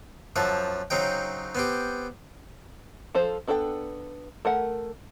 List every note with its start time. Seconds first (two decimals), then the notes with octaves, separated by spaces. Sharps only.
0.36 F#2 F3 E5 F#5 A5
0.90 C#3 F#3 C4 D#4 G5
1.55 B3 C4 G4
3.15 F3 F4 A4 C5
3.47 B3 D4 A4 C#5 G5
4.45 A3 A#4 F#5